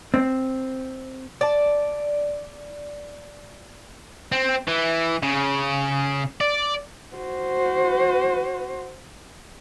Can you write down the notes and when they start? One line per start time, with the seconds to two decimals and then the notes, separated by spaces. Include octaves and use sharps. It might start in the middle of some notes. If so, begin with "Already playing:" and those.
0.14 C4
1.41 D5 A5
4.32 C4
4.67 E3
5.23 C#3
6.41 D5
7.16 F#4 C5